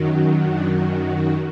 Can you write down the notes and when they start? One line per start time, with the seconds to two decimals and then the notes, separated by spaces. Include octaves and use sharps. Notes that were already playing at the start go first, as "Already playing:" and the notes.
Already playing: F#2 D#3 F#3
0.49 D4